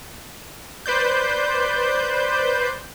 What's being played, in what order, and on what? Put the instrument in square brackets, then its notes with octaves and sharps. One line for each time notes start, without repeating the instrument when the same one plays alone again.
[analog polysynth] B4 C5 D5 G6